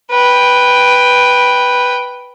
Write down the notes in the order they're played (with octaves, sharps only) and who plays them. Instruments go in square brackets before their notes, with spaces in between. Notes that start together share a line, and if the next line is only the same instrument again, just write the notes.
[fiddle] B4 G5